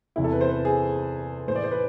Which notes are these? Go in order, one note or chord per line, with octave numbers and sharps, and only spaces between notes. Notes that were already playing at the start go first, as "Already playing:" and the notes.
E2 C3 E3 E4
A4
B4
C5
B4
G#4
A2 E3 C5
D5
C5
B4